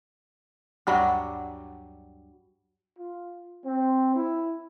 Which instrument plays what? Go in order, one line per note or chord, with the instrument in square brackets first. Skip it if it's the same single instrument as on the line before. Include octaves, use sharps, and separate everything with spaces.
[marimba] D2 G2 F#5 [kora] F#3 G3 D4
[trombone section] F4
C4
E4